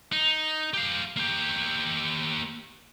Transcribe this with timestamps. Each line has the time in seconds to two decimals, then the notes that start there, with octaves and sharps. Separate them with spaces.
0.12 D#4
0.74 G4 F5
1.17 A#3 G4